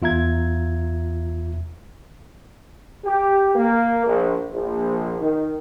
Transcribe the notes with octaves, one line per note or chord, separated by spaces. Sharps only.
E2 F4 E5 A#5 G#6
G4
A#3
A#1
A#1
D#3